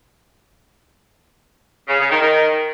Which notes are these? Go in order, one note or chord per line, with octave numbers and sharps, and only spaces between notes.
C#3
C#3
D#3
D#3